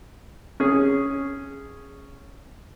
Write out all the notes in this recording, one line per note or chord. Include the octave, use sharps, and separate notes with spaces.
C#4 G#4